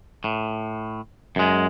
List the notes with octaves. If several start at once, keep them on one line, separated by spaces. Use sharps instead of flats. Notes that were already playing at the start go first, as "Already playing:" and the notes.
A2
F#2 G#3